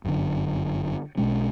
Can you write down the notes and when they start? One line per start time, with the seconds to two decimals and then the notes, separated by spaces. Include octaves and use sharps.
0.04 G1 F#2 D3
1.17 B1 B2 G#3 C#4